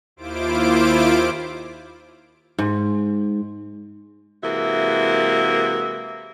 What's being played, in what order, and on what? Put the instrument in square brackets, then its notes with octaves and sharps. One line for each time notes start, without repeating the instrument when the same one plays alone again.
[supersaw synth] D#2 E4 F4 C5 D6 D7
[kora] G#2
[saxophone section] C3 E3 G#3 A#3 F#4 E5